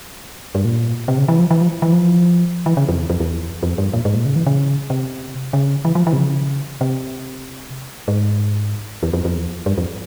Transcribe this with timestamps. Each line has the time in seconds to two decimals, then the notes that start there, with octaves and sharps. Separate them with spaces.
0.55 G2
0.65 A#2
1.08 C3
1.18 C#3
1.28 E3
1.39 F3
1.51 E3
1.61 F3
1.82 E3
1.92 F3
2.66 E3
2.77 C#3
2.88 F2
2.99 E2
3.10 F2
3.20 E2
3.63 F2
3.78 G2
3.93 A#2
4.05 G#2
4.15 A#2
4.25 C#3
4.36 E3
4.46 C#3
4.90 C3
5.53 C#3
5.85 E3
5.95 F3
6.07 E3
6.13 C3
6.17 C#3
6.81 C3
8.08 G#2
9.03 E2
9.13 F2
9.25 F2
9.35 E2
9.66 G2
9.78 F2